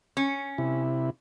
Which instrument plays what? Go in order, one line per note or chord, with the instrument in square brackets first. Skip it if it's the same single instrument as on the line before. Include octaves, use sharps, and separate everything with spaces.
[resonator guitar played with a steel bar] C#4
[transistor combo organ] C3 E4